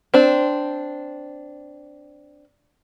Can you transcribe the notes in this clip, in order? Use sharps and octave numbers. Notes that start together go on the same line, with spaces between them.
C4 D4